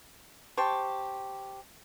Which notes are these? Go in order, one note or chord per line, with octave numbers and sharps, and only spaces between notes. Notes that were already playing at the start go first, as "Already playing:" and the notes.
G4 C5 A5 C#6